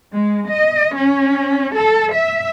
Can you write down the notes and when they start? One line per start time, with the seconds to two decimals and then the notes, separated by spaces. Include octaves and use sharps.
0.12 G#3
0.48 D#5
0.95 C#4
1.76 A4
2.14 E5